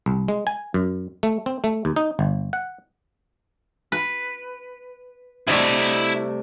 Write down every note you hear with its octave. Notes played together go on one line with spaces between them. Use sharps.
C2
G#3
G#5
F#2
A3
C4
A3
D#2
D#4
G1
F#5
B4
C3 G3 A3 E4 D#5